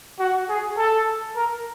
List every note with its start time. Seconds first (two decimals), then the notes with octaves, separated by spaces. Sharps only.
0.20 F#4
0.49 G#4
0.77 A4
1.36 A#4